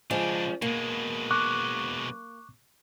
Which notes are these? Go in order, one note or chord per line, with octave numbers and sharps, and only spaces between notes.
C#3 F3 G#3 D4
B2 G#3 A#3
C#6 D6 F#6